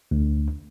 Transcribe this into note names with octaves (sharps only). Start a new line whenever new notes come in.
D2